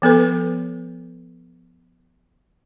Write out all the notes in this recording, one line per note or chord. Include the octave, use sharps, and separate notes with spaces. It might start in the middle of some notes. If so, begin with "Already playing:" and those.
F3 B3 A4 B4